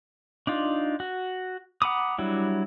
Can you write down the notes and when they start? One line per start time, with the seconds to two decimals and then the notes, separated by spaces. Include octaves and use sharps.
0.47 D4 D#4 F4
1.00 F#4
1.82 F#5 A#5 B5 D6 D#6
2.18 F#3 G3 D4 E4